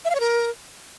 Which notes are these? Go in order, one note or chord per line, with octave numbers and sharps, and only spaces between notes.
E5
F5
C#5
A#4